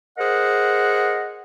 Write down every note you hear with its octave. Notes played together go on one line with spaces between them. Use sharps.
G#4 A#4 C5 D#5 F#5